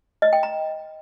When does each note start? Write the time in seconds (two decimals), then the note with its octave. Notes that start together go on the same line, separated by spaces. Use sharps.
0.22 D#5
0.33 G5
0.43 A#5